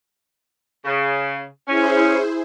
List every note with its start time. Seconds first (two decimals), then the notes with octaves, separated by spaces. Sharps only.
0.85 C#3
1.68 C#4 E4 G#4 C5